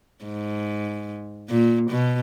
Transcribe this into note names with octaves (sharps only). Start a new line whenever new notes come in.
G#2
A#2
B2